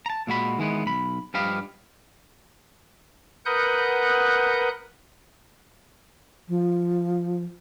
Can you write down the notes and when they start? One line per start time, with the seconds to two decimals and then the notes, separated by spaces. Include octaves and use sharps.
0.06 A5 A#5
0.27 A#2 G#3 F#4 B5
0.59 D#3 E3 G#3 B3
0.86 B1 B5
1.34 G2 F3 G4 D#5 F5 B5
3.45 A#4 B4 F#5 D#6 F#6 G6
6.48 F3